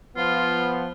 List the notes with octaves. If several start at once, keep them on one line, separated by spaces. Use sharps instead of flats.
F3 B3 F4